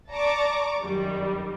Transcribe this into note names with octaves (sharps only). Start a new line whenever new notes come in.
D5 A5 A#5 C#6 D6
F#2 D#3 G3